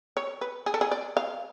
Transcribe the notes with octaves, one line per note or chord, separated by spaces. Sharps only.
C#5
B4
G#4
A4
G#4
D5
F5